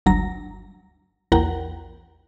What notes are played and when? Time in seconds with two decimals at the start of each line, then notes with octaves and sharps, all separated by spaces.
0.06 G1 D2 F#3 A#5 A#6
1.32 A#1 E2 A#4 F#5 G5 A#5